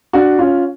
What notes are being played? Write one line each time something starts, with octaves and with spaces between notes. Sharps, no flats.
D4 F#4
C#4 F4